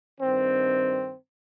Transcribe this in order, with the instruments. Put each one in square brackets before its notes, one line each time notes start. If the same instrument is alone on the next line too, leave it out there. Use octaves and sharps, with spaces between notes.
[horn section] G2 D#3 C4